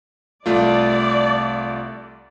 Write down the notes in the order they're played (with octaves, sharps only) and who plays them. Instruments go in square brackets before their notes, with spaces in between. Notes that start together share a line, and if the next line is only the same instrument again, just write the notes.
[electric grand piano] C2 A3 F4 [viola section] D5